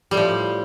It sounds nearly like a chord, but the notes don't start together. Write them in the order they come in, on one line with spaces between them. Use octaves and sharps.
G3 A2 F3